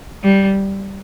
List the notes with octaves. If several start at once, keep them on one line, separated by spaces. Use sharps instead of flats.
G3